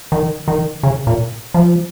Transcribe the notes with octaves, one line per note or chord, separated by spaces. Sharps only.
D#3
D#3
C#3
A#2
F3